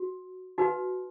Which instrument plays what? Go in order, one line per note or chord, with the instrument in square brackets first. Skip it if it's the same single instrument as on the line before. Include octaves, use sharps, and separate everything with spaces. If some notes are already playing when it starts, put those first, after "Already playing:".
Already playing: [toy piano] F#4
D#4 F#4 B4